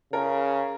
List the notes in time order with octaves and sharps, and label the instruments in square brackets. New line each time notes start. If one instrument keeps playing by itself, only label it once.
[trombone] C#3 [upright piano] A#4